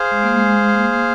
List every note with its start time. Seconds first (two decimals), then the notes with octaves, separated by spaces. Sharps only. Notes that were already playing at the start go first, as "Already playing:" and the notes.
Already playing: G#4 C5 F5
0.11 G#3
0.23 A#3
0.36 G#3
0.74 A#3